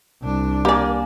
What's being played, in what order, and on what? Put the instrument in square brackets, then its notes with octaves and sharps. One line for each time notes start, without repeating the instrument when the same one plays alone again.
[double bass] C2 D4
[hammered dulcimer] A#3 G#5 [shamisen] G4 D5